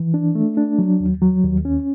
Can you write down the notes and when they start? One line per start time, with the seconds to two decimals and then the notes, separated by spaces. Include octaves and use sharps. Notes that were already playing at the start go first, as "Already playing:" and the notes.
Already playing: E3
0.14 D4
0.35 A3
0.57 D4
0.78 F#3
1.00 D#2
1.22 F#3
1.44 D#2
1.65 C#4